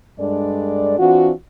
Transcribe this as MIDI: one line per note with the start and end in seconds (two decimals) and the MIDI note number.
0.19 0.96 43
0.19 0.96 56
0.19 0.96 62
0.19 0.96 69
0.19 0.96 74
0.99 1.31 52
0.99 1.31 60
0.99 1.31 62
0.99 1.31 65
0.99 1.31 66